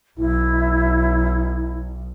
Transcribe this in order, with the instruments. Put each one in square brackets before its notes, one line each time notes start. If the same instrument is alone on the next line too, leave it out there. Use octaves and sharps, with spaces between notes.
[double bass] B1 [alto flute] E4